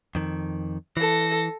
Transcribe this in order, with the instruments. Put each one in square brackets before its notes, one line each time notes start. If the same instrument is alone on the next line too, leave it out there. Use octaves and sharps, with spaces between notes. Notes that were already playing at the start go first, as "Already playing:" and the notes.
[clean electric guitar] F2 D#3
[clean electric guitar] E3 [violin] A4 A#6